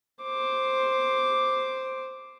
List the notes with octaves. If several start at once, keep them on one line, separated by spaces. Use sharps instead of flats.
C5 D6